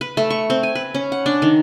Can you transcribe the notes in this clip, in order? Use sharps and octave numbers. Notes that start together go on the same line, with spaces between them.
B4
A3
C#6
C4
G#5
B4
C#4
F#5
D4
D#3